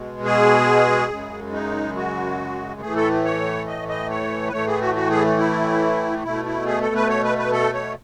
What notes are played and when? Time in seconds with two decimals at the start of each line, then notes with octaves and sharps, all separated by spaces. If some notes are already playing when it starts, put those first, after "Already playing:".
Already playing: B2 G#3
0.25 G#4
1.10 F#2 C#3 G#3
1.53 D#4
1.96 F#4
2.81 A2 E3 A3 G#4
2.96 A4
3.24 C#5
3.67 D#5
3.88 D#5
4.10 C#5
4.48 B4
4.53 A2 E3 A3 C#5
4.67 G#4
4.81 F#4
4.95 F#4
5.10 G#4
5.38 E4
6.24 B2 A3 E4
6.45 E4
6.66 G#4
6.81 A4
6.95 B4
7.09 C#5
7.24 B4
7.38 B4
7.52 A4
7.74 C#5